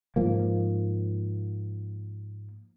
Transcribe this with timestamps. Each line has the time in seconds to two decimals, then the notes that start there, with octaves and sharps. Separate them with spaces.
0.16 G#2 F3 A#3